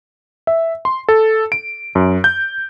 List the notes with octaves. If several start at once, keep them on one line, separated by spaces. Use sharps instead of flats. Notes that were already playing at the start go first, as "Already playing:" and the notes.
E5
C6
A4
D7
F#2
G6